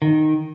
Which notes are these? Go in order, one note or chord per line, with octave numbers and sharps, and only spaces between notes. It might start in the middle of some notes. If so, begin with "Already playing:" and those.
D#3